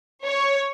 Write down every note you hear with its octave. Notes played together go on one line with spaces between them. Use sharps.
C#5